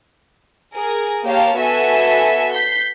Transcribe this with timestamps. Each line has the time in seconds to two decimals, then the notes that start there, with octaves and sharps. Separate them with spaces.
0.75 G#4 A#4
1.25 A#3 G4 C#5 F5 A5
1.59 B3 F#4 A4 E5 G#5
2.55 G6 B6 C7